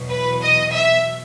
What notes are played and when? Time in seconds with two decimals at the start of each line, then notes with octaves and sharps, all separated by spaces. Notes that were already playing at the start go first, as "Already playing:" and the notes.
Already playing: E2 B2 F#3
0.09 B4
0.41 D#5
0.72 E5